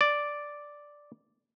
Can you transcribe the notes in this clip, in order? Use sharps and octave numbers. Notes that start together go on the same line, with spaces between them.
D5